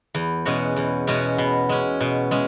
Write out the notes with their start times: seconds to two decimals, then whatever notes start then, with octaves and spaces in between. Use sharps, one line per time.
0.15 E2
0.45 B2 G#3 C#4 F#4
0.76 E2
1.07 B2 G#3 C#4 F#4
1.38 B2
1.69 G#3 C#4
2.01 B2
2.31 G#3 C#4